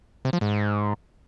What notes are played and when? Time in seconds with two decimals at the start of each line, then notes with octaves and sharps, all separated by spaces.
0.25 C3
0.33 F3
0.41 G#2